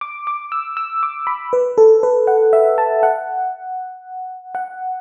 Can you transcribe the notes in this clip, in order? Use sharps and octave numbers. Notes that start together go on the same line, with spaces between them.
D6
D6
E6
E6
D6
B5
B4
A4
B4
F#5
E5
A5
F#5
F#5